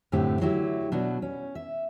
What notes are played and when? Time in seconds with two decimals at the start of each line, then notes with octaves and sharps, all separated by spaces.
0.12 F#2 A2 D3 A3 C4 G4
0.41 D3 F#3 A3 E4 G4
0.92 B2 F#3 D4
1.22 C#4
1.55 E5